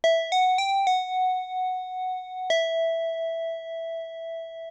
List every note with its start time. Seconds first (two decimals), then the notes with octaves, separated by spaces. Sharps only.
0.04 E5
0.32 F#5
0.58 G5
0.87 F#5
2.50 E5